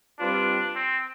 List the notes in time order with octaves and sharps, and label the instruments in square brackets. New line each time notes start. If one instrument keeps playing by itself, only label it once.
[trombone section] G3 C4 F4 B4 [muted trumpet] D4
[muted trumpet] C4